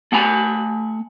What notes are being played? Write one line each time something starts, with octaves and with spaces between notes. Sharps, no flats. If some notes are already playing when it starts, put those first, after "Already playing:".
A3 F#5 G#5 B5